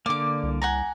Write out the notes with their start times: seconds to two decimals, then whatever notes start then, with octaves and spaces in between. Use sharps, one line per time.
0.06 D3 A#3 D5 D6
0.43 C2
0.62 F#5 G#5 A#5